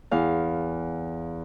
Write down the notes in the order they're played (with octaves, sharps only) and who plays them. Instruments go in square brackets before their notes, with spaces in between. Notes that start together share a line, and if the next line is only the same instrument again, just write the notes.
[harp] E2 F5